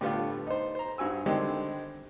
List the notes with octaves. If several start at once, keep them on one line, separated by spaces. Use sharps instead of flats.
A2 D3 G3 B3 F4
D#4 C5
C5 A#5
G2 F#4 G#5 E6
D3 D#3 G3 G#3 C4